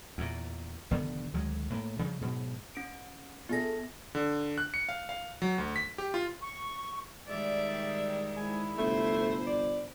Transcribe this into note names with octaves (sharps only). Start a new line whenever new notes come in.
E2 A#2
F1 D3 D#3 B3
D2 D#3 F#3 G#3
A2 A3 A#3
C#3 F3 G3
G#2 B2 F#3
C#4 D7
B3 F4 G#4 A4 A#6
D3
F#6
C#7
F5
F5
F#3
D2
B6
G4
F4
C#6
D#3 G3 G#3 D5 E5
G#2 E4 G#5
G1 C3 A3 C5
D5